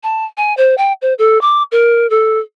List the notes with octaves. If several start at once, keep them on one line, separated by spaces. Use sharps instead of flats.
A5
G#5
C5
G5
C5
A4
D6
A#4
A4